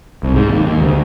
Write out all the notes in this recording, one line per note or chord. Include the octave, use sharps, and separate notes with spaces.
C2
G#2
D#2
D#2
D2